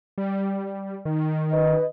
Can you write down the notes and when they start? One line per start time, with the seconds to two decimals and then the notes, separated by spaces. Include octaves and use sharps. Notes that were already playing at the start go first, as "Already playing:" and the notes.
0.18 G3
1.05 D#3
1.52 B4 D#5